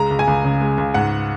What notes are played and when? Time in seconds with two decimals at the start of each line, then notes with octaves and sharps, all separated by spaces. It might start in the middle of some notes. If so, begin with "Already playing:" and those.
Already playing: C#2 G#3 A#5
0.10 C#2
0.19 G#5
0.28 C#2
0.44 C#3
0.61 G#3
0.78 C#2
0.94 G#2 F#5